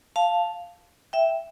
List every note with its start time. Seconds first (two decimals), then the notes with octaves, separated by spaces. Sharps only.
0.16 F5 A5
1.13 E5 G5